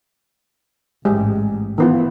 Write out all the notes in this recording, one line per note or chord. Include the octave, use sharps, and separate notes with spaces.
A1 G#2 G#3 G4
D#3 E3 B3 F4